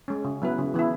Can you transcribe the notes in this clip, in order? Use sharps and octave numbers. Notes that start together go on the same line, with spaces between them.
G#3 C#4
C#3
F#3 B3 E4 B4
C#3
E3 B3 E4